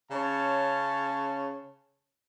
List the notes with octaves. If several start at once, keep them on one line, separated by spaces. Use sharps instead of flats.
C#3 C#4 C#5 A5